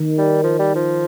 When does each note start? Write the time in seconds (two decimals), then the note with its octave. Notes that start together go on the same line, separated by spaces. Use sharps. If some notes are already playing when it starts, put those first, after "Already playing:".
Already playing: D#3
0.18 G3
0.44 F3
0.59 G3
0.76 F3